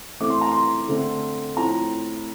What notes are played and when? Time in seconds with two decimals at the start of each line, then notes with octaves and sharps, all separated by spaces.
0.20 E3 A3 C4 D6
0.30 C6
0.41 A#5
0.51 C6
0.88 D3 A3 C4
1.57 A2 F3 C4 A#5